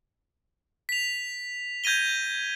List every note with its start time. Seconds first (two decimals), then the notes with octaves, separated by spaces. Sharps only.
0.89 B6 F7
1.84 G6 G#6 A#6 D#7 G7